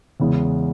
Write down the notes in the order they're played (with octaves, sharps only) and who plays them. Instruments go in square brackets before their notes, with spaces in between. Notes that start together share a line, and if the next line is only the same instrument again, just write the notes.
[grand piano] E2 C#3 E3 G#3 B3